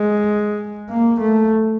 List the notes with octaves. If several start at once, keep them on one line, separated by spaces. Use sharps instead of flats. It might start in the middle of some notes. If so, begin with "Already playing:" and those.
Already playing: G#3
A#3
A3